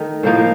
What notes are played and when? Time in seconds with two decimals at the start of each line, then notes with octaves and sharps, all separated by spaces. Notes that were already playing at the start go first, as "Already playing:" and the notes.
Already playing: D#3 A3 D#4
0.23 A2 F3 A#3 D#4